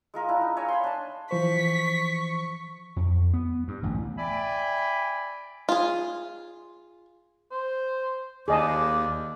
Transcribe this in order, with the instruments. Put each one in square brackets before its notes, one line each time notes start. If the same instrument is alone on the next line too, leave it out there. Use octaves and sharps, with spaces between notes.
[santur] G#3 F4 A#4
D4 E4
D#4
C#5 E5 F5 G#5
B5 C6
D4 A5
[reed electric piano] E3 F3 C5 [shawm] C#6 [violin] B6
[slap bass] F2
B3
G2
A1 D2
[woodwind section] D5 E5 G5 G#5 B5
[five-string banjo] F4 G#4
[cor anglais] C5
[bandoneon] D#2 [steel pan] G#4 D#5 A5 [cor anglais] D5